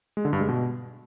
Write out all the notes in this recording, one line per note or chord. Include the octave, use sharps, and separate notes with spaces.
G#3
D3
G2
G#3
B2